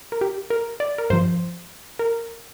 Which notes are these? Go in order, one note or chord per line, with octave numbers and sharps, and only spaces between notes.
A#4
G4
A#4
D5
A#4
G2 F3 C5
A#4